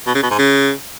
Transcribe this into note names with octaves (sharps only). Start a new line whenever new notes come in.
B2
C#3
B2
G#2
C#3